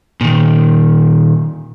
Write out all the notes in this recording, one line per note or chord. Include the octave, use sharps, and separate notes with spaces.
A#2 D#3